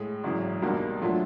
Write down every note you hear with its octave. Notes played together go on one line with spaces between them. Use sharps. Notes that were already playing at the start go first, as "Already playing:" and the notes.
Already playing: A2 G#3
G#1 F#2 C#3 E3
C#2 B2 G3 A#3 D#4
A#2 F#3 A3 D4 F4